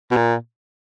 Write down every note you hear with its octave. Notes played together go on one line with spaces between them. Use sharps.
B2
A#2